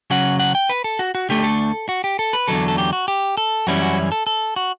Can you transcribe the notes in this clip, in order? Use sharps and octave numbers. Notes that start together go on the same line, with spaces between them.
C#3 F#3 C#4 F#5
F#5
G5
B4
A4
F#4
F#4
D2 D3 A3 G4
A4
F#4
G4
A4
B4
E2 D3 F#3 A4
A4
G4
F#4
G4
A4
F#2 E3 G3 C#4 E4 F#4
F#4
A4
A4
F#4